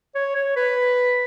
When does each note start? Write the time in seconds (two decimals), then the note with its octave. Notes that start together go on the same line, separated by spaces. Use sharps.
0.15 C#5
0.35 C#5
0.56 B4